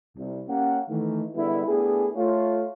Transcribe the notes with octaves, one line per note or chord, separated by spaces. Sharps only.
C2
A#3 C#4 G4 F#5
D#3 E3 A3
D3 G3 G#3 B3 E4
A3 B3 D4 E4 G4 G#4
A3 F4 C#5